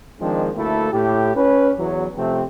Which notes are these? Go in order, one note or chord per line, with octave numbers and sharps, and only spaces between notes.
D#3 F3 G#3 C4 D4
D2 A3 A#3 E4 A4
A2 G4
C#4 B4
E2 F#3
C3 F3 A3 C4